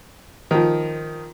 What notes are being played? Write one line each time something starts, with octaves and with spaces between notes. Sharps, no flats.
D#3 F3